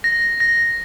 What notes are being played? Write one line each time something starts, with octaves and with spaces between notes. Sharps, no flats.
A#6
A#6